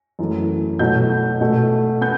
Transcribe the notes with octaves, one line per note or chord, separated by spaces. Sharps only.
F#2 E3 A3
B2 F#3 A3 G6
B2 A3
B3 G6